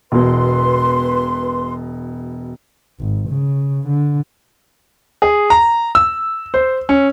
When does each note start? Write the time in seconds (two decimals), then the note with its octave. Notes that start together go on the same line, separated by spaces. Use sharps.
0.12 E1 B2 B4 C6
3.00 G#1
3.29 C#3
3.87 D3
5.22 G#4
5.50 A#5
5.95 E6
6.54 C5
6.89 C#4